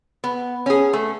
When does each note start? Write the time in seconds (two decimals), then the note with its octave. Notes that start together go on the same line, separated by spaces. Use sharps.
0.24 B3
0.66 C#4 G#4
0.93 A3